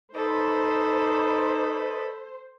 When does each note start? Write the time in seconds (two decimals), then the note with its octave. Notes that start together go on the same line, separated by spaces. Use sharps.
0.15 D#4 A4 B4 C5 D5 D#5 B5